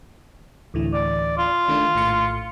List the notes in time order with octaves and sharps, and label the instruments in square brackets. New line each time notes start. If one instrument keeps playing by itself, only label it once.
[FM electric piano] D2 A2 E3
[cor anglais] D5
F4
[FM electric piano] D#3 A3 D4
A#1 A2 C#7